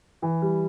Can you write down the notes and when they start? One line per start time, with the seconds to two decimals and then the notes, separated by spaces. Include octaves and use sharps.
0.22 E3
0.42 G3